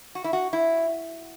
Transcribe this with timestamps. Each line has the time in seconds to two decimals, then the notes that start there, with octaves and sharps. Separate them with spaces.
0.15 F#4
0.24 E4
0.33 F#4
0.53 E4